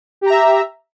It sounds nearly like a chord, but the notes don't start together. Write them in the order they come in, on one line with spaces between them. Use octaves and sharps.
G4 A#5 E5